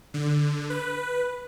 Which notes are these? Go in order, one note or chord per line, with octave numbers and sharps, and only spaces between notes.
D3
B4